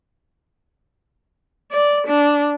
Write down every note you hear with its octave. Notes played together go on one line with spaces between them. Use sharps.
D5
D4